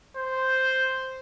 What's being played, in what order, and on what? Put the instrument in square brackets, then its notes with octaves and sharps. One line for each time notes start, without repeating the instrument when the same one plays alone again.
[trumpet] C5